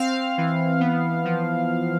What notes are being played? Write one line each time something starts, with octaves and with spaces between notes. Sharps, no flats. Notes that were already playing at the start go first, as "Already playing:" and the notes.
Already playing: C4 F5
E3
B3
F3